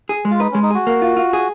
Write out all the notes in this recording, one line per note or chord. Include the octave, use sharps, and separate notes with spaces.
G#4
G#3
F4
D#4 B4
C#4
G#3
D#4
F#4 G#4
A#3
F4
F4
G#4